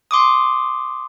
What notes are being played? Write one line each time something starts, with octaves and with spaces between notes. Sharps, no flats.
C6 D6 D#6